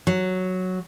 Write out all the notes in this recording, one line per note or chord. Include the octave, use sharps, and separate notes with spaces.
F#3